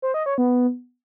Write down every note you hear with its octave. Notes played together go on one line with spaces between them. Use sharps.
C5
D#5
C#5
B3